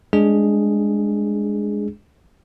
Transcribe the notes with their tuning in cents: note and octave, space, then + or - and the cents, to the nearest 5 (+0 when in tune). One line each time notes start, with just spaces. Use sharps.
G#3 +0 D4 +0 G#4 +0